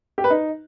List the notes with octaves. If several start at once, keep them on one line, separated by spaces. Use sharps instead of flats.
G4
B4
D#4